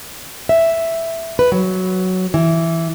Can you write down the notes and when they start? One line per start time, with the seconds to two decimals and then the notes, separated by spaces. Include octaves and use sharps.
0.49 E5
1.39 B4
1.52 F#3
2.34 E3